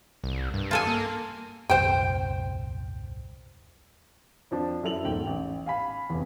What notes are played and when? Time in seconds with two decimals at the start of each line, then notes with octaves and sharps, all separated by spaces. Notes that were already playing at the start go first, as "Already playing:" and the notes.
0.24 C2
0.54 G2
0.71 F4 A4 G#5
0.87 A#3
1.70 D#1 C2 F#2 C5 G5
4.51 F2 F3 D4 A5
4.83 F#2 E4 A4 F7 F#7
5.05 E1 G#2 G5
5.27 A1
5.66 F5 G#5 B5
6.10 F1 E2